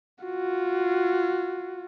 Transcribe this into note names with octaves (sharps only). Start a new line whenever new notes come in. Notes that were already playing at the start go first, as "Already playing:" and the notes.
F4 F#4